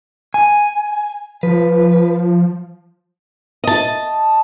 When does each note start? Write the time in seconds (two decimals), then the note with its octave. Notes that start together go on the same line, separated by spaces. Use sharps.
0.34 G#5
1.43 F3 B4
3.64 D#5 A5